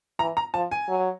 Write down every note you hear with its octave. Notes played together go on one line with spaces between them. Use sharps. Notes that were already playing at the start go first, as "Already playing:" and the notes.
E3 A#5
A#5
F3 A5
G#5
F#3